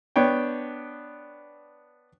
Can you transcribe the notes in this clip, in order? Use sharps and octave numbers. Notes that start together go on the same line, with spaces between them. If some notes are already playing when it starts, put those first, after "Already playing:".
B3 D4 C#5 G5